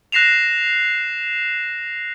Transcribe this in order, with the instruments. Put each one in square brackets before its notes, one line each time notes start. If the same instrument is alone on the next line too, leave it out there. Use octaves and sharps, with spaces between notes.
[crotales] F#6 A#6 C7 E7 F7